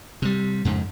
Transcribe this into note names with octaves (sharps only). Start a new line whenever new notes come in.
C3 G3
F2 G#2 C#3